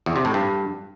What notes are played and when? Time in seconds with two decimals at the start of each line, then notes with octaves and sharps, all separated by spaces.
0.06 E2
0.16 C3
0.25 A2
0.34 G2